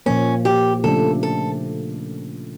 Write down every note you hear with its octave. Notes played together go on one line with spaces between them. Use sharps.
A#2 F3 A#3 C#4
G4
C#3 F3 A3 D4 A4
A4